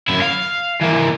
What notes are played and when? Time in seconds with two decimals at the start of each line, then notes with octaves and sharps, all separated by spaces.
0.08 F#2 E4
0.22 F5
0.81 E3 A#3